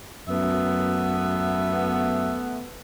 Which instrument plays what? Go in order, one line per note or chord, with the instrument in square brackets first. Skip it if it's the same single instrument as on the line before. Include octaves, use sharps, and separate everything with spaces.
[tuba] F#2 [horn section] A3 B3 [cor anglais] E5